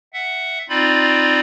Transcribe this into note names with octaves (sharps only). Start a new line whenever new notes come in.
E5 F#5
C4 D#4 F4 D5 B5